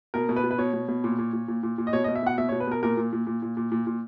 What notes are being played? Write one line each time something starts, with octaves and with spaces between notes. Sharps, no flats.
B2 A#4
B2
B4
B2
B4
B2 C#5
B2
B2
A#2
A#2
A#2
A#2
A#2
A#2
D#5
B2 C#5
D#5
B2
E5
B2 F#5
B2 E5
C#5
B2
B4
B2 A#4
A#2 A#4
A#2
A#2
A#2
A#2
A#2
A#2
A#2